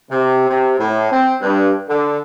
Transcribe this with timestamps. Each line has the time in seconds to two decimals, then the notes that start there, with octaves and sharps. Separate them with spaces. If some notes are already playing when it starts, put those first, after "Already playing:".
0.10 C3
0.49 C3
0.79 A2
1.11 C4
1.42 G2
1.89 D3